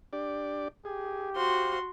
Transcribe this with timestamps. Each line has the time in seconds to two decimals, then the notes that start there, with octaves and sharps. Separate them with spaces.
0.13 D4 G4 D5
0.85 G4 G#4
1.36 F#4 C5 F5 C6